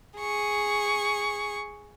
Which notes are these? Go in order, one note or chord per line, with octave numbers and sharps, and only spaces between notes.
G#4 C#6